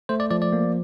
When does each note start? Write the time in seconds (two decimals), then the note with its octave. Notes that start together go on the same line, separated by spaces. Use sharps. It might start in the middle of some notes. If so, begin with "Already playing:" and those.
0.09 A3 C5
0.20 D5
0.30 F3 D5
0.42 D5
0.53 A#3